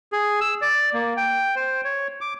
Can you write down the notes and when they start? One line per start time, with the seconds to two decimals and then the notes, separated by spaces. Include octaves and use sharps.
0.12 G#4
0.41 E6
0.62 D5
0.94 A#3
1.17 G5
1.56 C5
1.84 C#5
2.21 D6